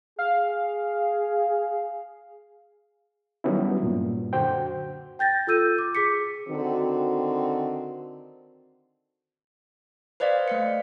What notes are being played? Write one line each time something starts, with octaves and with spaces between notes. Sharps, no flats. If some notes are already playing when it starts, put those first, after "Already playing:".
G#4 F5
D#3 F#3 G3 B3 C#4 E4
G2 A#2
F#2 D3 F#4 C5 G5
G5 G6 A6 A#6
F4 A4 E6 G6 D#7
D6
G#4 D6 B6 C#7
D3 D#3 C4 F#4
B4 C5 D5 D#5 F5
A3 F5 C#7